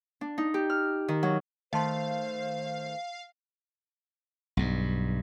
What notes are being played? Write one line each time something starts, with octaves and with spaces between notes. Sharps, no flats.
D4
D#4
G4
F6
D#3
F#3
D#3 A3 C5 D#5 F5 A5 C6
B1 G2